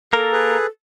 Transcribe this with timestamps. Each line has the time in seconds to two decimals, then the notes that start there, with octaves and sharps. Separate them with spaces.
0.13 A#3 A4 A#4
0.32 G#4 B4